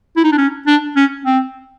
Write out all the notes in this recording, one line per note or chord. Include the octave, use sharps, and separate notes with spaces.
E4
D#4
D4
C#4
D4
C#4
C4